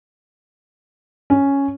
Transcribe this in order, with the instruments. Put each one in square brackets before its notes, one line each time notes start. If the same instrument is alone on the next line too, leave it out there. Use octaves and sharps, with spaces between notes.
[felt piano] C#4